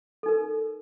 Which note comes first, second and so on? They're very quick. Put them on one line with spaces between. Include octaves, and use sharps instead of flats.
A4 D#4 A#4